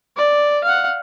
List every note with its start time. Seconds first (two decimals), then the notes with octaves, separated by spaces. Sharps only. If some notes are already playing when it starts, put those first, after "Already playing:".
0.17 D5
0.64 F5 F#5